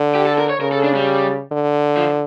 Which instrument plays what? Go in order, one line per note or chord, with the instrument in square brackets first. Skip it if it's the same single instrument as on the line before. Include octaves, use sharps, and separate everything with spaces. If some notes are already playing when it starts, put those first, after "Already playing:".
Already playing: [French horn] D3
[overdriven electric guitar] G4
A4
A#4
C#5
[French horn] C#3 [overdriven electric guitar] A#4
[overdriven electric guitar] A4
D4
G3
[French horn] D3
[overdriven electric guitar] F3